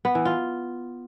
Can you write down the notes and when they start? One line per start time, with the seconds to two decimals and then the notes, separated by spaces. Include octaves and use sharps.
0.05 B3
0.15 E3
0.25 F4